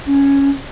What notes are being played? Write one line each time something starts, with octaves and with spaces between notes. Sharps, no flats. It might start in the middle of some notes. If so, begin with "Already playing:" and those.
C#4